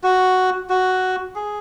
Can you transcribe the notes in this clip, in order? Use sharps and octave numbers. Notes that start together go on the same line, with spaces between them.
F#4
F#4
G#4